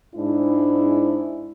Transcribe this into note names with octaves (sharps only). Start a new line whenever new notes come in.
G#2 G#3 D4 E4